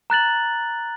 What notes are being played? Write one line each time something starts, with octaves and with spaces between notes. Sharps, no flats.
A#5 F#6 A6 F#7